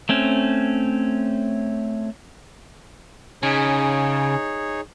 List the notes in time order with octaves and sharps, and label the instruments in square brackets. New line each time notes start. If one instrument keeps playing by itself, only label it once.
[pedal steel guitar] A3 C4 C#4
[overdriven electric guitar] C#3 [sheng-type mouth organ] D#4 G#4 C#5